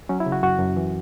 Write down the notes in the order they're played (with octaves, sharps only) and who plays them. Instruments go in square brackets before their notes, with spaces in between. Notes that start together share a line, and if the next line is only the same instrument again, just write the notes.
[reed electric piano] F#3 C#4
E4
C#3
F#4
F#2 F#4
F#2
E3